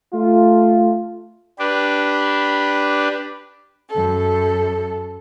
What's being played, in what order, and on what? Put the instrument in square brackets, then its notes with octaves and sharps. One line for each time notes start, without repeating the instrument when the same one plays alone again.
[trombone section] A3 F4
[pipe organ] D4 G4 B4
[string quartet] F#2 A4